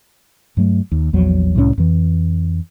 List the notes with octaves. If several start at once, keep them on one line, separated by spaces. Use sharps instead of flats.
G2 F#3 A3
D#2
A#1 E2 F3 F#3
C2 A2 E3 C#4
F2 E3